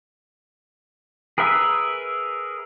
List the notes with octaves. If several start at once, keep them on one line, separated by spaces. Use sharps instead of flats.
G#4 A#4 B4 E5